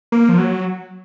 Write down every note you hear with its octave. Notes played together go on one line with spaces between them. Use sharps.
A#3
F3
F#3